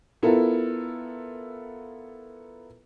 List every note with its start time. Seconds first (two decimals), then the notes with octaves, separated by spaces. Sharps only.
0.23 B3 E4 F4 A4 A#4